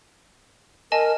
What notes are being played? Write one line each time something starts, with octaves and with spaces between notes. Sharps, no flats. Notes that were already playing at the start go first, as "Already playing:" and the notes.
A#4 D#5 G#5 A5